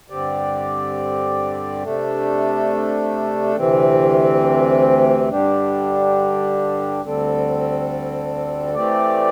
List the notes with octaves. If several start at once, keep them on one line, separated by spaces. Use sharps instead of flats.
G2 D3 C4 G4 D5
C3 A3 D4 A4
D2 C3 E3 C4
G2 D3 G3 D4 G4
D2 D3 G3 C4 A4
E3 A3 C4 G4 D5